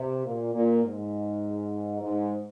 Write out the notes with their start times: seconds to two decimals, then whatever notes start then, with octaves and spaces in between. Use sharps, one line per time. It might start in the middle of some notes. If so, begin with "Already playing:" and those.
Already playing: C3
0.25 A#2
0.54 A#2
0.84 G#2
2.02 G#2